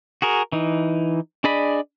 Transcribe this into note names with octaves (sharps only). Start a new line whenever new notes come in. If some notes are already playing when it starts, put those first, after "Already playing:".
F#4 G#4 A#4
E3 D#4
D4 G#4 D5 D#5 B5